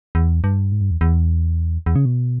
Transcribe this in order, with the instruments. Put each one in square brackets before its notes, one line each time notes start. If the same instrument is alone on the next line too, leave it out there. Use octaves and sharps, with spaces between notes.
[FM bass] E2
G2
G#2
G2
E2
E2
E2
C#3
B2